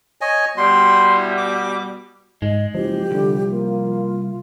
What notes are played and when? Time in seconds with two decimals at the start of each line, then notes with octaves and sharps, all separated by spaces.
0.21 C#5 D#5 G#5
0.57 B2 G3 C6
1.16 E4
1.37 D6
2.42 G#2 G#3 D#5
2.75 F#1 F3 G4
3.11 C2 D3
3.51 A#3 F4